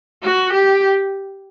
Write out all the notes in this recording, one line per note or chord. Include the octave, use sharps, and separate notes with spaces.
F#4
G4